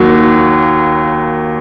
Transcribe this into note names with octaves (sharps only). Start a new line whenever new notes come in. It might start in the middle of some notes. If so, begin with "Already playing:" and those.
Already playing: D#2 D#3 F#3 A#3